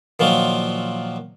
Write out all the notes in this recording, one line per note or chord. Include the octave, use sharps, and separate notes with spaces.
A#2 D#3 F3 F#3